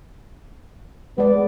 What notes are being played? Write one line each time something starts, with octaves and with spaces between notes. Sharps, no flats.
G#3 B3 D5